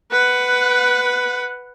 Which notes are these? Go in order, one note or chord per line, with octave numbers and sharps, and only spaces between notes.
B4 F#5